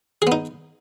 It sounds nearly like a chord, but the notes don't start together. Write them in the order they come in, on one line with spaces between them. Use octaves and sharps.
G#4 B3 D#4